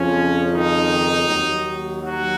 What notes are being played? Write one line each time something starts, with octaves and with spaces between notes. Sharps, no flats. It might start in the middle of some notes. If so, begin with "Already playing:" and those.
Already playing: F2 C#3 F3 C#4
D#3 D#4
D#2 D#3 F#3
F#3 F#4